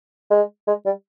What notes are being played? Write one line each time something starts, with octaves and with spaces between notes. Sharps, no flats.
G#3
G#3
G3